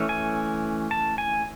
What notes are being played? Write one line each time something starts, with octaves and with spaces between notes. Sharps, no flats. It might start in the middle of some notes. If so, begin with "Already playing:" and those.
Already playing: E3 A3 C#4
G#5
A5
G#5